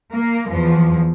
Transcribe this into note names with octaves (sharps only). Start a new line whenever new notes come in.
A#3
E2 F3